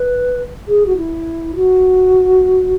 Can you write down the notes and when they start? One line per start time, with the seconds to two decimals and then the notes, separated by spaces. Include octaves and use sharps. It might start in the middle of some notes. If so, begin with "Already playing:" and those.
Already playing: B4
0.68 G#4
0.86 F#4
0.97 E4
1.55 F#4